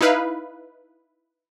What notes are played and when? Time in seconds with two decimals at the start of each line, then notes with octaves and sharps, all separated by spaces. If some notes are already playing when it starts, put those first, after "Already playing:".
0.01 D#4 E4 B4 F5